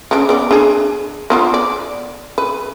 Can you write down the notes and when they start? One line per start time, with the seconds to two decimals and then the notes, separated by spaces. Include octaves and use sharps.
0.11 C#3 D4
0.29 B3 D5
0.51 D4 G#4
1.30 B3 D4 F4
1.54 D5
2.38 B4